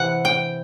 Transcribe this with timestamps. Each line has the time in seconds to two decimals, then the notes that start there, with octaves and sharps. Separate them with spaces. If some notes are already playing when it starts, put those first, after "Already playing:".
Already playing: C3 E3 C4 F#5
0.25 G5